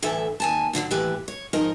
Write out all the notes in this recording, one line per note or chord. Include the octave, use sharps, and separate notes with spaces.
D2 A2 E3 A4 E5
D#2 G#5 A5
A2 D3 F3 F#3
D#2 A2 E3 G4 B4 E5
C#5
G#2 F3 D#4 A#4 D#5